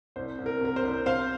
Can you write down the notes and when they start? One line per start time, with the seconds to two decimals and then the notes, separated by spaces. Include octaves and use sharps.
0.16 C2 C5
0.38 C2
0.46 A#4
0.61 C3 A#4
0.76 C5
0.83 C2
1.06 C3 C5 F5